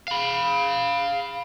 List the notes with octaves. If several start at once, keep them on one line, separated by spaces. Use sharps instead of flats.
F5 B5